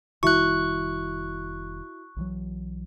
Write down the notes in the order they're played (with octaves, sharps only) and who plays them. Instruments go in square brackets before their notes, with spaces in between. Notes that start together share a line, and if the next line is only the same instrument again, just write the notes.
[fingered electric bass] F1 D#3 G3 [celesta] E4 F#4 E5 [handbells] C#6 F#6
[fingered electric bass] B1 E3 F#3